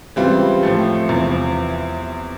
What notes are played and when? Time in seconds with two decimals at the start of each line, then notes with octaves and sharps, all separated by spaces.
0.16 C#3 E3 G3 C4 F4
0.63 A2 F3 A3
1.09 E2 C3 F3